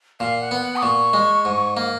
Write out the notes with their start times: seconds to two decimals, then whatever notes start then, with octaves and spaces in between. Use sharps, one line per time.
0.20 A#2 F5
0.41 F#5
0.51 B3
0.61 F#5
0.77 D#6
0.82 A#2 C#6
1.13 G#3
1.45 G#2
1.77 A#3